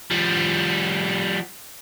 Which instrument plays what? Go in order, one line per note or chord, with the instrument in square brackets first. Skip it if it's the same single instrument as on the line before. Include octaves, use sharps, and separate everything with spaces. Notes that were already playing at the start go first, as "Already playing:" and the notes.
[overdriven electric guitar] F3 G3